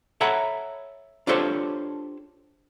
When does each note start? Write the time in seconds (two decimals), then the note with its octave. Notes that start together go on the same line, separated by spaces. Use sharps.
0.21 A4 C#5 E5 F#5 A#5 B5
1.27 D4 F4 G4 A4 C5 C#5